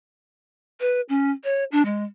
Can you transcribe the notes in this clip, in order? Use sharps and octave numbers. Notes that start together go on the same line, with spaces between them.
B4
C#4
C#5
D4
G#3